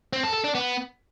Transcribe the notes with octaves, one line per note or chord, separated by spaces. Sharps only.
C4
A4
A4
D4
B3